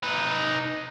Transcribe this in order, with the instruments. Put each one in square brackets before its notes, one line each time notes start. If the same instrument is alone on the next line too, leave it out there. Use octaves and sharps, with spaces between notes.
[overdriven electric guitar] D#4 B4